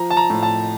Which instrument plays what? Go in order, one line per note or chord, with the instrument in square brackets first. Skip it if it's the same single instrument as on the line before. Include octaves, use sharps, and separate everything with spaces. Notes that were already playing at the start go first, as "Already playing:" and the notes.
Already playing: [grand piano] F3 A#5
A5
A#5
A2
A5